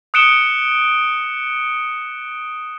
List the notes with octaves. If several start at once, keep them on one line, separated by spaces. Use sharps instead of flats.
D#6 F#6 C#7 D7 E7 G7